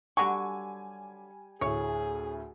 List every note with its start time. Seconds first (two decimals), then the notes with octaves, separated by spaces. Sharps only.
0.17 D3 F#3 G3 G#5 C#6
1.61 D2 A2 G#4 C#5